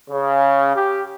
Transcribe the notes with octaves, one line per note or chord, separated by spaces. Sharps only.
C#3
G4